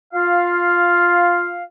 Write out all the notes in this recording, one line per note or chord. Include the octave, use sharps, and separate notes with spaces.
F4 F5